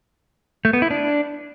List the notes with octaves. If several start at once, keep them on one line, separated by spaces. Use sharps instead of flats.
A3
B3
E4
D4